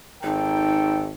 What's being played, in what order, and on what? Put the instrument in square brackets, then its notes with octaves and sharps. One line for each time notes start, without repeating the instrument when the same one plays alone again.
[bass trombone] G#1 [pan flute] D#4 [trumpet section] A4 G5